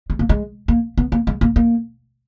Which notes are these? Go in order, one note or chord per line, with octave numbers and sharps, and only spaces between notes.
G#3
A#3
G#3
A#3
B3
A#3
G#3
A#3
A#3